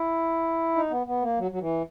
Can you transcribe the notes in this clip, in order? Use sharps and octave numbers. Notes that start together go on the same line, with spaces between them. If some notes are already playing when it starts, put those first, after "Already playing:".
Already playing: E4
D#4
B3
B3
A#3
F#3
F#3
E3